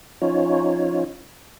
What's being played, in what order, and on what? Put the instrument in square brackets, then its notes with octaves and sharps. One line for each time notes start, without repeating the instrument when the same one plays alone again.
[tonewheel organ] F3 C#4 D#4 F4 C#5